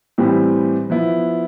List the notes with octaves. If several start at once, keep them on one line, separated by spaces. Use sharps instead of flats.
A2 E3 G3 C4 G4
F3 B3 E4